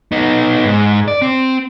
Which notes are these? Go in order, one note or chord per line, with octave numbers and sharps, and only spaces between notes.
B3 D#4
G#2
D5
C4